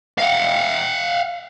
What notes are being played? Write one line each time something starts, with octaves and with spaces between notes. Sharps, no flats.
F5 F#5